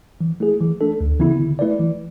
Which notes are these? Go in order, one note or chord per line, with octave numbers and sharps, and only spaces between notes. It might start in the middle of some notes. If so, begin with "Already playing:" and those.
E3
A3 E4 G#4
E3
A3 D4 A4
D2
C#3 E3 B3 E4
D3
A3 E4 B4 D5
E3